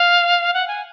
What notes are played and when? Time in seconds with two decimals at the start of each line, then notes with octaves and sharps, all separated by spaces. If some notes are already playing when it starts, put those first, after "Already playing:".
Already playing: F5
0.54 F#5
0.68 G#5